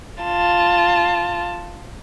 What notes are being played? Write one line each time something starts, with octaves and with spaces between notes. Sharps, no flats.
F4 A5